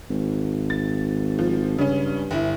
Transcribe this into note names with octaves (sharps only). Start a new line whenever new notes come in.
G#1
A6
F3
G2 C#3 C#4
G1 E4